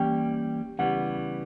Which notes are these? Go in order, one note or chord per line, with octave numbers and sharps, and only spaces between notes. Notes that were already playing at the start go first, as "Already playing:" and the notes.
Already playing: E3 G3 A#3 C#4 G5
C#3 E3 G3 B3 F#5